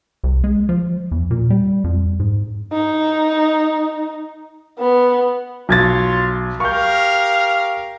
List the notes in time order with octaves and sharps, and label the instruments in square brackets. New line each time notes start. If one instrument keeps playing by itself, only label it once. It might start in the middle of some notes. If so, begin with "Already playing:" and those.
[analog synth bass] C2
G#3
F3
E2
A#2
G3
F2
G#2
[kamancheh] D#4
B3
[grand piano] B1 G#6 A6 [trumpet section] F4 C#5 C6
[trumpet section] G4 A#4 F5 [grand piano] C#6 G6